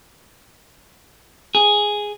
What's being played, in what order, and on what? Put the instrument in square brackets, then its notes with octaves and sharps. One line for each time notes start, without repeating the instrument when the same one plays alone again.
[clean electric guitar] G#4